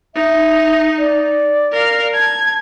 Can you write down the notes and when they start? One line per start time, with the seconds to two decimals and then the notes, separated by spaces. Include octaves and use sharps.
0.15 D#4 E5
0.98 D5
1.72 A#4 F5
2.14 A5 G#6